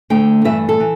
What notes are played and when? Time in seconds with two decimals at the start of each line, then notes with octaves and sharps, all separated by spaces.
0.10 D2 D3 A3 G5
0.45 G2 E3 A3 E5
0.69 A4
0.80 E3